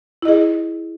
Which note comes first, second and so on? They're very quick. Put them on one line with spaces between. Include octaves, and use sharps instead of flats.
E4 D#5 G#4